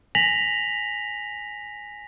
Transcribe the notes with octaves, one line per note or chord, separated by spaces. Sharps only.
G#5 A#6 B6 F7 F#7